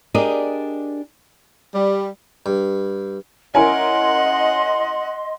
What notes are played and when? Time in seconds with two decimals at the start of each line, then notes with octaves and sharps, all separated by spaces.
0.14 D4 G4 G#4 A#4 D5 D#5
1.74 G3
2.46 G2
3.55 C#4 E4 A#4 D#5 F#5 G#5 C6